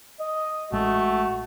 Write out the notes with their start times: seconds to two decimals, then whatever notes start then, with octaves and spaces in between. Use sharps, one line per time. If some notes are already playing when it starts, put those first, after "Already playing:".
0.20 D#5
0.73 A1 G#3 A3 F#4